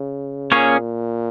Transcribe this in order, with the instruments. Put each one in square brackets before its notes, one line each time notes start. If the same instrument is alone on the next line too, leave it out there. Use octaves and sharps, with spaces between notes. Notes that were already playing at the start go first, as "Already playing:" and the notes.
Already playing: [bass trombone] C#3
[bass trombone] A#2 [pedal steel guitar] A#3 C#4 G#4 C#5